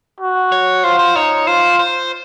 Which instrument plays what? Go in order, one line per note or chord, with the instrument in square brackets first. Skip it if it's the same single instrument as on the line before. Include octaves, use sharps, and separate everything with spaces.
[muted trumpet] F#4
[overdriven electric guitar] C#5
[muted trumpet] F4 [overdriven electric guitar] C5
[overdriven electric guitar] C5
[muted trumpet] D#4 [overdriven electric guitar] C#5
[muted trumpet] F4 [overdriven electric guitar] C5
[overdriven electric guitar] C5